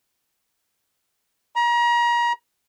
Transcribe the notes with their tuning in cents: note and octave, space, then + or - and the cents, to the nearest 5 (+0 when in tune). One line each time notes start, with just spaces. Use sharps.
A#5 +35